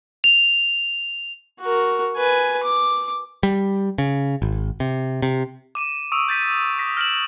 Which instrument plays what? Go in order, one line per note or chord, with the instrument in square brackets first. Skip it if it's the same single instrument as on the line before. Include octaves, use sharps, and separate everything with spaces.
[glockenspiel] F7
[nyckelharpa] F#4 A#4
B4 G#5
D6
[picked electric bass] G3
C#3
G#1
C3
C3
[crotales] D6 D#7 E7
C#6 D#6 E6 D7 D#7 F7
G6 A6 B6 D#7
D#6 A#6 B6
F6 A#6 D7 E7 F#7